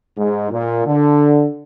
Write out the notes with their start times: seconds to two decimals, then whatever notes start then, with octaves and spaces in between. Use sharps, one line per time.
0.17 G#2
0.51 A#2
0.85 D3